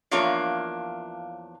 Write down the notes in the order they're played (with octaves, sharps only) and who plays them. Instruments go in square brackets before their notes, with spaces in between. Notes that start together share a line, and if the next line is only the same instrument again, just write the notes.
[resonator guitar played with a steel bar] E2 F3 A#3 D4 F4 C#5